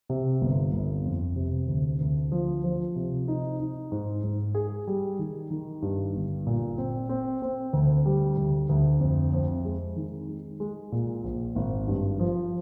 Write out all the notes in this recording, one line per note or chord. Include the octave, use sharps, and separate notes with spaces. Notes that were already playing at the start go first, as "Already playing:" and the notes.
C3
G1
G1
F2
C3
D2
D2
F3
F3
C3
D#4
D#4
G#2
G#2
G#4
G3
D#3
D#3
G2
G1
A#2
C4
C4
C4
D2
G3
D2
D2
F2
F2
G#3
D#3
G#3
G#3
A#2
A#1
G#1
G2
F3